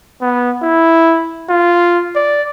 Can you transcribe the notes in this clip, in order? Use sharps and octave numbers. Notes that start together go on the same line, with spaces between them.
B3
E4
F4
D5